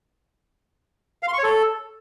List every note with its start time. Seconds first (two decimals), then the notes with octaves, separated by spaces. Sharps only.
1.23 F5
1.28 C6
1.33 C#6
1.38 C#5
1.43 A4